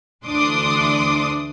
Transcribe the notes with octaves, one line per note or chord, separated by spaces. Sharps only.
D2 E3 D4 C6 D6 D#6